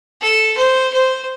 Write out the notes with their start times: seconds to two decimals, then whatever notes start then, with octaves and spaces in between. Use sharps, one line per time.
0.21 A4
0.57 C5
0.93 C5